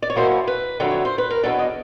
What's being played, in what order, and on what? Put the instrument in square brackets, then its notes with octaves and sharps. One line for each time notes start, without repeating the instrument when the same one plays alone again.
[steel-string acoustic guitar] D5
C#5
B2 F#3 A#3 C#4 E4 C5
B4
F2 D3 F#3 A3
C#5
C5
B4
A#4
E2 B2 F#3 B3 D4 A4
D#5